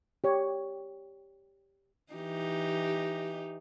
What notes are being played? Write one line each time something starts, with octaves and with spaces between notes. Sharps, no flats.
G4 C#5
E3 D#4 G4